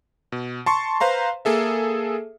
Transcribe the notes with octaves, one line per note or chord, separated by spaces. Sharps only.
B2
A5 C6 C#6
B4 C5 F5 A#5 C6
A#3 G#4 A4 E5